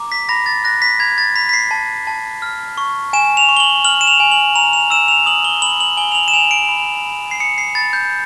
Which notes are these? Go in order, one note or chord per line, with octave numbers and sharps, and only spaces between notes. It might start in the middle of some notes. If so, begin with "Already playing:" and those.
Already playing: A#5 D6
B6
B5 A#6
A6
F#6 A#6
B6
B5 G#6
A6
B5 B6
B6
C7
A5
A5
F6
C#6
G#5 E7
F7
C#6
G7
F#7
F6 F#7
E7
F7
G#5
F#7
A#5 F7
F7
E6 E7
F7
D#6 F#7
G7
B5 F#7
F#7
G#5 G7
F7
F#7
E7
G#5 F7
D7
B5
B5
C7
D#6 C#7
C7
B5 A6
G6